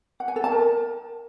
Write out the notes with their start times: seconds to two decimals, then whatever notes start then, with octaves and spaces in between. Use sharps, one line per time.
0.20 F#5
0.28 G#5
0.36 A4
0.44 A5
0.52 A#4